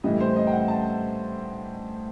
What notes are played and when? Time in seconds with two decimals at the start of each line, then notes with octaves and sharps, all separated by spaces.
0.04 A2 E3 G3 D#5
0.20 C5
0.36 D#5
0.47 G5
0.52 F#5
0.68 A5